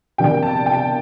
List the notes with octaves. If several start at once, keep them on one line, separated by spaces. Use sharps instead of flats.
F2 C3 F3 A#3 D4 G5
A5
G5